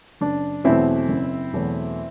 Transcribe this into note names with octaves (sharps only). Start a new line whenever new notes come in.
F#1 D4
E2 B2 F#3 A3 C4 E4
F#1
E2 B2 F#3 A3